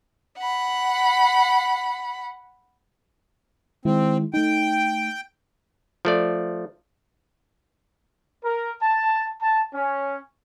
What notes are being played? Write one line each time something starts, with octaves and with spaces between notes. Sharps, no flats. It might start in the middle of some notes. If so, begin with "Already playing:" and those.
F#5 B5
D#3 G#3 C4 E4
A3 D#4 G5
F3 A3 D5
A#4
A5
A5
C#4